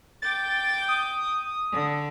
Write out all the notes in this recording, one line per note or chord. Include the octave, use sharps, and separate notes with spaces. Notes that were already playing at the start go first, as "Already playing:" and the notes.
G5 D6 G6 A6
D#6
D3